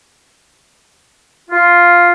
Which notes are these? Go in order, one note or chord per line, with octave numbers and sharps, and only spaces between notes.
F4